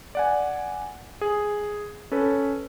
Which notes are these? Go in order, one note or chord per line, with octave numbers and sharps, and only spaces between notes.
D5 F#5 G#5
G#4
C#4 A4 B4